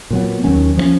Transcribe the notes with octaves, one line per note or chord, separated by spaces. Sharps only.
A#2 F#3 B3
D#2 D#3 F#3 C#4
F3 G#3 C#4